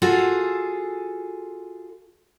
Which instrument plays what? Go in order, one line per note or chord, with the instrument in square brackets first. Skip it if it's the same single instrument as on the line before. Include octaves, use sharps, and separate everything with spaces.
[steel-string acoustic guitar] F4 F#4 G#4 A4